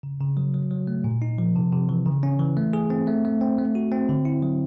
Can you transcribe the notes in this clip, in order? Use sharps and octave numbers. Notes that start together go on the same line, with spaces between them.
C#3
C#3
F#3
F#3
F#3
A3
A#2
D#4
F3
C3
C3
E3
C#3
C#4
E3
A3
G#4
C4
A3
A3
C4
A3
F#4
C4
D3
E4
F#3